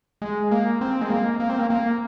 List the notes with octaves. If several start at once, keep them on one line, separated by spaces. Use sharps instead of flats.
G#3
A#3
C4
G#3
A#3
A#3
C4
A#3
A#3